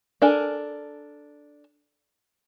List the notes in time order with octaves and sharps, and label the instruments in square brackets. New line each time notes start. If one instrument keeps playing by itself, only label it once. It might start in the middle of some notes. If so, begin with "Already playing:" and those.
[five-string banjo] D4 A4 A#4 G#5